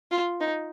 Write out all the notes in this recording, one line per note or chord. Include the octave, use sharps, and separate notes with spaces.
F4
D#4